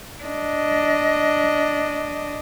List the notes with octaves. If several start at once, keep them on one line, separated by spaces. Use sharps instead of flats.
D4 D#5